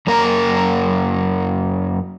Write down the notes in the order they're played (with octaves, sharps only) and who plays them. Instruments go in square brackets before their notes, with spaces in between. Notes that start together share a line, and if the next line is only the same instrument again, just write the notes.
[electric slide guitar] F#2 A#3 A#4 A#5